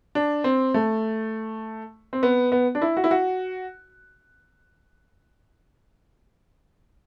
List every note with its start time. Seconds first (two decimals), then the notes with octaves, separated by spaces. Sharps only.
0.15 D4
0.44 C4
0.74 A3
2.13 C4
2.23 B3
2.52 B3
2.75 D4
2.82 E4
2.97 F#4
3.04 E4
3.11 F#4